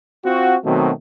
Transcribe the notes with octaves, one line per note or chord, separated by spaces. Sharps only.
C4 F4 F#4
B2 D#3 F#3 A3 C4